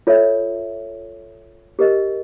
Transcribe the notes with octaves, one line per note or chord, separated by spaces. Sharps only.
F4 A4 C#5 E5
G4 A#4 D#5